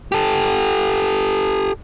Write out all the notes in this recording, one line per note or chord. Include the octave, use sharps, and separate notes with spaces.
G4 A4